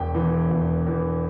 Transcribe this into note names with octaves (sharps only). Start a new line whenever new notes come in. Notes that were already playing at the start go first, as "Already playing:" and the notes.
Already playing: E1 G5
E2 E3
E1
E2 E3